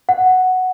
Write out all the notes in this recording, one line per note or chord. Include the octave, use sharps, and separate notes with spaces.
F#5